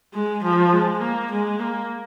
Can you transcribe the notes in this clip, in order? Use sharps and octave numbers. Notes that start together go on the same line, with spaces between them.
G#3
F3
G#3
A#3
G#3
A#3